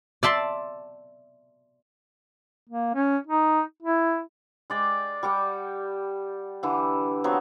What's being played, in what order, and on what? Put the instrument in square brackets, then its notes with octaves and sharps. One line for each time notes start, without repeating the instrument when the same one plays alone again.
[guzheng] D5 E5 A5 C6
[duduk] A#3
C#4
D#4
E4
[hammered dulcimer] G#3 D5 G5
G3 G4 F#5 G5
D3 E3
F3 F#3 B3 C4